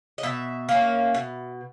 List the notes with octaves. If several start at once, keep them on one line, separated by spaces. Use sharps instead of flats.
D#5
B2 E5
A#3 C#4
B2